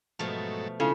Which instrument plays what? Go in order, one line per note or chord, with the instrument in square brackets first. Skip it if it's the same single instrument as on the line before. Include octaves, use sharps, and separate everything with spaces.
[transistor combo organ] G#2 F#3 A4 [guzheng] B2 F3 A3
[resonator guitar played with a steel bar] C#3 [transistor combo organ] G#3 [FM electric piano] E4 F4 A4